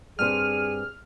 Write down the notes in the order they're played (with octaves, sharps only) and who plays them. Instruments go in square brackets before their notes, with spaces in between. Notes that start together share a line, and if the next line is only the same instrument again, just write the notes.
[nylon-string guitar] G2 C4 C5 [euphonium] G#4 [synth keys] F6 [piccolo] D#7